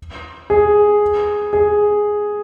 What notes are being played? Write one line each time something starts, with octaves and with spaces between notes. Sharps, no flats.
G#4
G#4